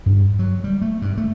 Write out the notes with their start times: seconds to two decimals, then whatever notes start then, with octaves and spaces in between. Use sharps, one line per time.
0.06 G2
0.39 F#3
0.64 G3
0.82 A3
1.02 G2
1.18 A3